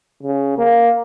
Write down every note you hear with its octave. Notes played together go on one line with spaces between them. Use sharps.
C#3
A#3